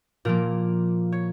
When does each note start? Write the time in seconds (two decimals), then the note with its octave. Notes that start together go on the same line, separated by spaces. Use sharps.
0.25 A#2 F3 A#3 A#4
1.12 C#5